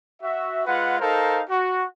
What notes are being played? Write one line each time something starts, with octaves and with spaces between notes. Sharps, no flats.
F#4 E5
G#3 F4 B4 F#5
D#4 A4 A#4 C5 F5
F#4